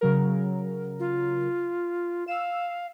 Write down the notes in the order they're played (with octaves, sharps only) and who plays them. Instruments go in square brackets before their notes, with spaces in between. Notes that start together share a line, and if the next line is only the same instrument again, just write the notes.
[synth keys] C#3 F#3 A#4
[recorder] F4
[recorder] F5 [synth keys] E6 E7